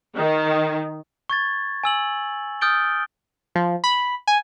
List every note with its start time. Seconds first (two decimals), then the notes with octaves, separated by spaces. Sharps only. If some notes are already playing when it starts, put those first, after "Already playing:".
0.15 D#3
1.30 C#6 G#6 A6
1.84 G#5 E6 F#7
2.61 D#6 F6 G6 A6 D7 G7
3.55 F3
3.84 B5
4.27 G#5